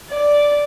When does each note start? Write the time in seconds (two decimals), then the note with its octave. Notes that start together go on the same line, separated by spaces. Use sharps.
0.10 D5